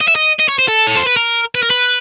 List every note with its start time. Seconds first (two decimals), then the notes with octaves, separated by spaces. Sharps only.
0.01 D#5
0.08 E5
0.16 D#5
0.40 D#5
0.49 C#5
0.59 C5
0.68 A4
0.87 C#5
0.97 C5
1.07 B4
1.17 A#4
1.55 B4
1.63 A#4
1.70 B4